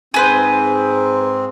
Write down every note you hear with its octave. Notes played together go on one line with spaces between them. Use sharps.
G#2 C4 G#4 B4 C5